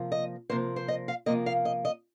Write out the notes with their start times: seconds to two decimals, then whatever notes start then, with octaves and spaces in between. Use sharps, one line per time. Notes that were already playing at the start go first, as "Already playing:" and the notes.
Already playing: C3 F3 A#3
0.12 D#5
0.50 C3 F3 A#3 C5
0.76 C5
0.88 D#5
1.08 F5
1.26 C3 F3 A#3 D#5
1.46 F5
1.65 D#5
1.85 D#5